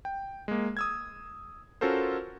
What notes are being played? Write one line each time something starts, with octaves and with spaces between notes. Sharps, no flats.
G5
G#3 A#3
D#6 E6 G#6
C#4 F4 F#4 A4 A#4 C5